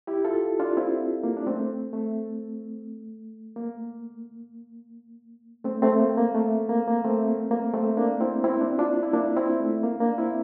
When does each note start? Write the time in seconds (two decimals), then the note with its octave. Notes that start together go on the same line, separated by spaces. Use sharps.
0.07 E4 G4
0.25 F4 A4
0.60 D4 F4
0.77 C4 E4
1.24 A#3
1.37 D4
1.47 A3 C4
1.93 A3
3.56 A#3
5.64 A3 C4
5.82 A3 C4
5.99 A#3
6.18 A#3
6.35 A3
6.69 A#3
6.88 A#3
7.04 A3 C4
7.27 A#3
7.51 A#3
7.74 A3 C4
7.97 A#3 D4
8.20 C4 E4
8.44 C4 E4
8.61 A#3 D4
8.79 D4 F4
9.03 E4
9.13 A#3 D4
9.36 C4 E4
9.60 A3
9.83 A#3
10.00 A#3 D4
10.18 C4 E4